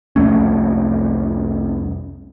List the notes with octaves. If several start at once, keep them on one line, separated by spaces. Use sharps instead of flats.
C2 F2 A3 C#4